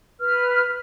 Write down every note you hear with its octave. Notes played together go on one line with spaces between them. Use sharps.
B4 F6